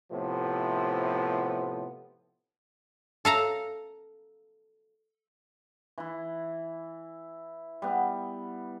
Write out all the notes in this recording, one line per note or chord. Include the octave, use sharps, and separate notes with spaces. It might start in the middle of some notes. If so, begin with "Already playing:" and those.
A2 C3 F3 B3
A4 F5 A#5
E3 E4
G3 B3